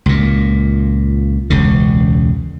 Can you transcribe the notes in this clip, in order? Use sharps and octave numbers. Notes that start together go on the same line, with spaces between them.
C#2 A#2
E1 C#2 C#3